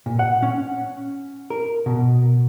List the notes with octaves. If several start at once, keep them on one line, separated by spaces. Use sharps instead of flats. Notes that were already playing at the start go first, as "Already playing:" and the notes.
A#2
F#5
C#4
A#4
B2